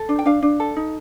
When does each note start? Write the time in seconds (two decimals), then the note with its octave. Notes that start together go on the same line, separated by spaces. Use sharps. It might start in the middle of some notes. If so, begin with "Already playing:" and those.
Already playing: A4
0.09 D4
0.19 G5
0.26 D4 F5
0.42 D4
0.60 A4
0.76 D#4